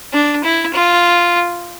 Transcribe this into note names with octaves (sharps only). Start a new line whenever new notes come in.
D4
E4
F4